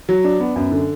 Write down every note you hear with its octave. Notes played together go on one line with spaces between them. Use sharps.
F#3
D4
B3
F#2
D3